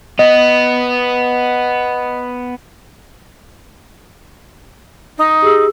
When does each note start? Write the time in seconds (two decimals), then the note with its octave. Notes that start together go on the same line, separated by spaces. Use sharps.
0.19 B3 D#5
5.18 D#4
5.42 G4 G#4 E6